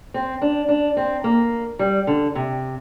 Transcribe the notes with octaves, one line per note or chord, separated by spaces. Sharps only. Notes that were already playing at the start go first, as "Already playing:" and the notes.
C4
D4
D4
C4
A#3
G3
D3
C3